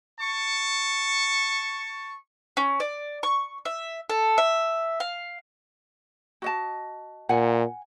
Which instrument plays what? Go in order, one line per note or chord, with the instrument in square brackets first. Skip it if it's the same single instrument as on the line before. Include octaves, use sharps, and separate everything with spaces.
[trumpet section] A5 C#6
[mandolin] C#4
D5
C#6
E5
A4
E5
F5
[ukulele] F#4 D#5 A5
[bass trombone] A#2 [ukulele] F#5 G#5